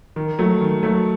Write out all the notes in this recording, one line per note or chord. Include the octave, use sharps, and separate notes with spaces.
D#3
F#3 A3
D#3
F#3 A3